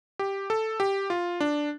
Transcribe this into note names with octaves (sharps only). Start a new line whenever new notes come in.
G4
A4
G4
F4
D4